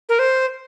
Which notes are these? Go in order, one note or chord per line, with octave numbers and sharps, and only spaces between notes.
A#4
C5